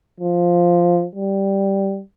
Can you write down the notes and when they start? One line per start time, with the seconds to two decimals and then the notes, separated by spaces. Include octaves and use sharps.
0.20 F3
1.15 G3